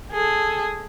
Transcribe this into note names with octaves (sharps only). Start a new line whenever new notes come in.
G#4 A4